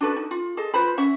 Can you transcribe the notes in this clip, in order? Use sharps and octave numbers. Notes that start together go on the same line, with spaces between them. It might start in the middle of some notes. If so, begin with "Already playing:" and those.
D4 F#4 A4 B4
D#4
F4
G#4 A4 D#5
F4 B4 C5 B5
C#4 E5 F#5